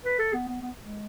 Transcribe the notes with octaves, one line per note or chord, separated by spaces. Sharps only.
B4
A4
B3
B3
B3
G#3